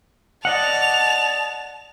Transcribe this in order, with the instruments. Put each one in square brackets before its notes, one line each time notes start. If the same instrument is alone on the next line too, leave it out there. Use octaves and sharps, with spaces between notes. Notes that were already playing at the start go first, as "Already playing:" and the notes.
[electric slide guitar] D5 D#5 F#5 [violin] A5 F7